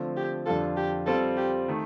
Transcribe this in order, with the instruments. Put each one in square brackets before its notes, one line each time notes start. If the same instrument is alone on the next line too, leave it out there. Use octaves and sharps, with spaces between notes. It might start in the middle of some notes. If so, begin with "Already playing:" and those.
Already playing: [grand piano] D3 F3 A3 C4
[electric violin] G4
[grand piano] F2 D3 G3 D4 F4 [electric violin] A4
[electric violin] G4
[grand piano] G3 C4 F4 [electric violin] A4
[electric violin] G4
[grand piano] D#3 A3